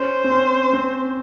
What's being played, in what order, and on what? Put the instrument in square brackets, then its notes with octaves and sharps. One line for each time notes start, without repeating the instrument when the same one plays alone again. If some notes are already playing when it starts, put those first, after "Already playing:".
Already playing: [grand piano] C#4 [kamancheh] C5
[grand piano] C4
C#4
C4